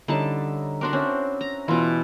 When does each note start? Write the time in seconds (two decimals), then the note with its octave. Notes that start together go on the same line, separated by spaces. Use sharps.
0.08 D3 G3 C#4 D#4 E4 A5
0.81 D4 F#4 A#4 C6 D6
0.93 C4 C#4 E5
1.41 A#5
1.68 B2 E3 E4 F4 B4